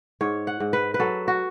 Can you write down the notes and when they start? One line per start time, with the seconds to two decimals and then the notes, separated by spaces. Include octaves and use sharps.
0.21 G#2 C#5
0.47 F#5
0.60 G#2
0.73 B4
0.94 B4
1.00 F#3 A4
1.28 F#4